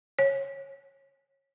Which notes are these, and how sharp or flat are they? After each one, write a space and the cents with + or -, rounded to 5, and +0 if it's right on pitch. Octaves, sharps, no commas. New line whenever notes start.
C#5 -20